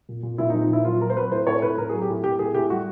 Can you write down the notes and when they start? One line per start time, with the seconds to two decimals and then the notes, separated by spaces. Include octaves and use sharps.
0.09 A#2
0.23 A#2
0.38 A#2 E4
0.50 D#4
0.54 F3
0.62 D#4
0.70 A#2 E4
0.85 F#3 F4
1.01 F#3 A#4
1.10 C5
1.17 F#3 B4
1.31 A2 C5
1.47 A2 C#5
1.62 A2 B4
1.78 A2 A#4
1.89 G#4
1.93 F#3
2.02 G4
2.09 A2
2.24 A2 G4
2.39 A2 G#4
2.54 A2 G4
2.70 G3 F#4